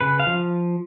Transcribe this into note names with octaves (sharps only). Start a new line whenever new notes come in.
C#3 B4
F5
F3